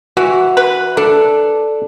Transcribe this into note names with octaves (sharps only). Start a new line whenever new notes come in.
E3 F#4
B4
D4 A4